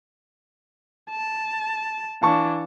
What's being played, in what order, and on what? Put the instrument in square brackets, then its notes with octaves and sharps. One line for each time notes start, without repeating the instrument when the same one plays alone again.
[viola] A5
[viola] E3 D4 [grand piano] F5 A5 C#6